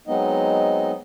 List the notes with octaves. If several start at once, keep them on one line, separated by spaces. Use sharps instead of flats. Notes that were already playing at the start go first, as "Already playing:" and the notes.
F#3 G#3 B3 C4 D#4 D#5